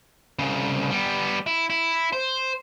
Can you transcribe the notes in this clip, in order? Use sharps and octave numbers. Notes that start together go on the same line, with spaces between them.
C2 C#3
G3 B3
E4
E4
C5